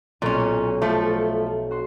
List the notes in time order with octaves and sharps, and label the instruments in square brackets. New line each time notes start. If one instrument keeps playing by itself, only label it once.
[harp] B1 [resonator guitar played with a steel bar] A#2 C#4
[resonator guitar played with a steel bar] F3 A3
[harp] F#4 C6